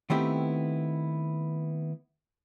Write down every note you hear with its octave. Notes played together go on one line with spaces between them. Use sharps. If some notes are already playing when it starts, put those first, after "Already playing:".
D#3 A3 B3 C4 E4 G4